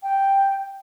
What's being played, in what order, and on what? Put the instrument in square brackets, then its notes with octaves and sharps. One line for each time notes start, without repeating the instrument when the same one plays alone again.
[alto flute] G5